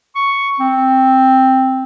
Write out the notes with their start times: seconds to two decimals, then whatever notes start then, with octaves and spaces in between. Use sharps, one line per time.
0.15 C#6
0.60 C4